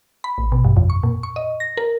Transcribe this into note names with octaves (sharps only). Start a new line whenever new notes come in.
B5
A1
B2
G2
F2
C#6
A#2
C#6
D#5
A#6
A#4